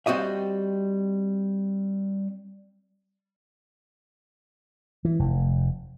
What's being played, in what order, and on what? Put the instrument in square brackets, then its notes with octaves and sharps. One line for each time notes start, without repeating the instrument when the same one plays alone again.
[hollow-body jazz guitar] G3 C4 F#4 D#5 E5
[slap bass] E3
F1